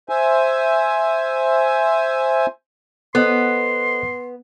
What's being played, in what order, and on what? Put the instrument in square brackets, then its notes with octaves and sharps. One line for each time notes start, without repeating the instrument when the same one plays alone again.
[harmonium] C5 E5 G#5
[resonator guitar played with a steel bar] B3 [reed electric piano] A4 C5 D#5 [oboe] C6